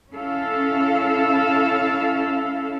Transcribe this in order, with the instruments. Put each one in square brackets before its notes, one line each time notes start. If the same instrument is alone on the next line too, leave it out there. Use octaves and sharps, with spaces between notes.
[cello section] C#4 E4 A4 F5